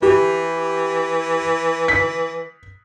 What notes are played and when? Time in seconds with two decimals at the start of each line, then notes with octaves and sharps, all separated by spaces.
0.02 E3 G4
1.88 B6